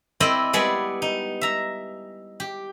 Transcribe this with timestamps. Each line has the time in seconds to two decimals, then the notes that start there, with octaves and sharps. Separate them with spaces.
0.20 C4 E4 D5 D#5 G5
0.53 G3 G#3 B3 G#4 D5
1.02 D#4
1.41 E5 A#5
2.40 G4